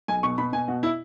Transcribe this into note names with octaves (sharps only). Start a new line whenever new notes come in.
B1 G#5
B2 C#6
B2 B5
B2 G#5
B2 F#4
E4